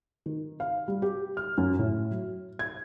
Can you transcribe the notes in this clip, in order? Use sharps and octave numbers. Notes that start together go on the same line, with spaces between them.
D#3
F5
G3
G4
F6
F#2
A2
F#3
G#6